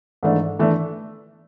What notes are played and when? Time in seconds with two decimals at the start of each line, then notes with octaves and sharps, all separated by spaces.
0.23 G#2 E3 A3 D4
0.59 E3 A3 D4